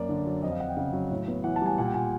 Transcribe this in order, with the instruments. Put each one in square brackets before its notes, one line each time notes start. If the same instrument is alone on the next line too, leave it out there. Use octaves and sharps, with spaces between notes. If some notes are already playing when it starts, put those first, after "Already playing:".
Already playing: [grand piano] F#2 A#3 D5
D3
F#3
F2 D#5
F5
F2 F#5
G5
C#3 F5
F#3
A2
B3
E3 F#5
A5
G3 G#5
A#2 F#5
G5
A#2 G#5